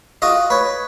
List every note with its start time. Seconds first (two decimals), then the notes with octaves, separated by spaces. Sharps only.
0.22 F4 F#4 D#5
0.50 B4 C#5